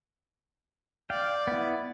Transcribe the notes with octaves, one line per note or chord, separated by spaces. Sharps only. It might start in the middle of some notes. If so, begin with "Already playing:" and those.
D5 F5 G5
B3 E4